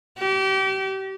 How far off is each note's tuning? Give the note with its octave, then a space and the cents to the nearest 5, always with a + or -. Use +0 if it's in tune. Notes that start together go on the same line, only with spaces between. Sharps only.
G4 -30